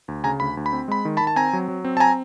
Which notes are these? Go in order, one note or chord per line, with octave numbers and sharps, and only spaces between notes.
D2
C#3 G#5 A#5
D2 B5
D2
B5
C4
G#3 B5
D#3
A5 B5
D#3
A5
C4 G#5 A#5
F#3
F#3
C4
A5
G#5 A#5